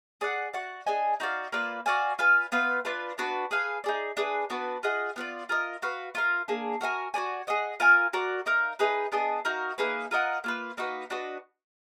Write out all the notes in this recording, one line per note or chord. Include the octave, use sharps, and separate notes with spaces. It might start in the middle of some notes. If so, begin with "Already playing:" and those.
G#4 D5 F#5
F#4 D5 F#5
D4 G#4 D#5 G#5
D#4 F#4 D5 F5
A#3 F4 B4 D5
F#4 D5 F5 G#5
F4 B4 F5 G#5
B3 F4 B4 F5
D4 F4 B4
B3 D4 F#4 B4
G#4 B4 F5 G#5
D#4 G#4 D5
D4 G#4 B4
B3 D4 F#4 B4
F4 G#4 D#5 F#5
B3 F4 B4 D5
F4 A#4 D#5
F#4 B4 F5
F4 A#4 F5
A#3 D4 G#4
F#4 A#4 F5 G#5
F#4 A#4 D5 G#5
G#4 D#5 F#5
F4 A#4 F5 G#5
F#4 A#4 D5
D#4 A#4 F5
D#4 G#4 B4
B3 D4 G#4 D#5
D#4 F#4 A#4 F5
A#3 D#4 G#4 B4
F4 A#4 D#5 F#5
A#3 F4 B4
A#3 D#4 F#4 B4
D4 F#4 B4 D#5